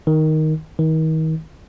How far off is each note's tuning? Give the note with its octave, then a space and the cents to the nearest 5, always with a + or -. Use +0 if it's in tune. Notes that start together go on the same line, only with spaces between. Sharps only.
D#3 +5
D#3 +35